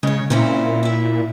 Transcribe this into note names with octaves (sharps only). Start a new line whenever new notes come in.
C#3 G#3 C#5
A#2 C4 C#4 E4
E4 E5